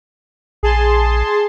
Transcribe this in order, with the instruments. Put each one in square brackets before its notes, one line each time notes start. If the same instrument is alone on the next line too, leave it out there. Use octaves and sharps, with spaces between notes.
[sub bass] A#1 [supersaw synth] G#4 A5 C6